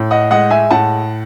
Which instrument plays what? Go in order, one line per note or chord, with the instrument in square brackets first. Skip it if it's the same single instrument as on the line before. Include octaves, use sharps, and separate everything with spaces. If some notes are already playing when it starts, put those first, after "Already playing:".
Already playing: [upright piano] A2
D#5 F#5
G#3 D#5 F#5
E5 G#5
A2 F#5 A5